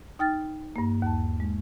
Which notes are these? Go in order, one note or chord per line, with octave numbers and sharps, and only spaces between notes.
D#4 G5 F6 A6
G2 A#3
D#2 A5
G#3